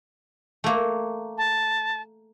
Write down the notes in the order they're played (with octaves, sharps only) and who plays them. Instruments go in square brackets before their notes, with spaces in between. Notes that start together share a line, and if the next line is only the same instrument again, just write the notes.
[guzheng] A3 A#3
[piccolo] A5